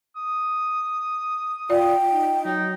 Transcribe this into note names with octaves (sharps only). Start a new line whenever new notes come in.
D#6
F4 D5 G5
D#4
F#3 D#4